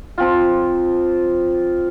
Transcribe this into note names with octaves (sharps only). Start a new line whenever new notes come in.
F3 C4 F4